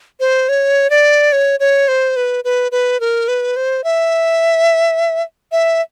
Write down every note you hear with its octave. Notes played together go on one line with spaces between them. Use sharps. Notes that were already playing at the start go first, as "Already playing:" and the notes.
C5
C#5
D5
C#5
C#5
C5
B4
B4
B4
A#4
B4
C5
E5
E5